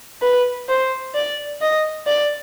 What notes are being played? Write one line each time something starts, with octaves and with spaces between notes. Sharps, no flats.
B4
C5
D5
D#5
D5